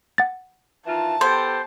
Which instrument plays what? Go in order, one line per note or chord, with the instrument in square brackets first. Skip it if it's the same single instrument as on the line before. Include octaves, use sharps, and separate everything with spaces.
[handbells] F#5 A6
[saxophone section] D#3 E3 F4 [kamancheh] A5
[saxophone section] B3 G4 A4 [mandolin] C5